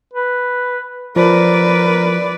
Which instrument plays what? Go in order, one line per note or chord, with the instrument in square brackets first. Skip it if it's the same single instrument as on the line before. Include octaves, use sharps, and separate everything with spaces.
[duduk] B4
[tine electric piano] F3 [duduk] A#4 [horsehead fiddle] B4 D5